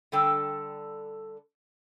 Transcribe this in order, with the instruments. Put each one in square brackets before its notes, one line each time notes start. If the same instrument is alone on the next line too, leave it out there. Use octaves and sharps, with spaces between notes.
[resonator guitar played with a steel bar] D3 G3 D4 A4 G5 A5